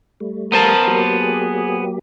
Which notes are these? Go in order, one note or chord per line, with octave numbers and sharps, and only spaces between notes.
G3 A3
B3 A#4 C5 A5
F#3 A#3 G4
G#4